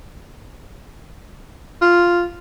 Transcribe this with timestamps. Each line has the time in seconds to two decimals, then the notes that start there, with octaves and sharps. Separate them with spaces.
1.82 F4